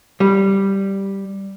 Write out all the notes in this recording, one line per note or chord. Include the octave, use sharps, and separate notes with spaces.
G3